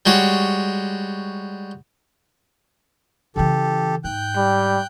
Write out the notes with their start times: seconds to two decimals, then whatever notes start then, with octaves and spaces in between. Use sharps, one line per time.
0.06 G3 G#3 F#4 C#5
3.36 C#3 E3 G4 A4
4.04 G#2 G5 F#6 G6
4.37 G3